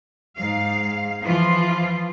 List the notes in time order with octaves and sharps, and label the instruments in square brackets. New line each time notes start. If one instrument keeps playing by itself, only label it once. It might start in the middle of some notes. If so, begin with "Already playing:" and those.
[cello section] G#2 F5
E3 F3 F4